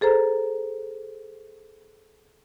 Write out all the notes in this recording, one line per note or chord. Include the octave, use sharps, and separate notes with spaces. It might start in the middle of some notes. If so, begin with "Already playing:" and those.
G#4 A4 C5 A#5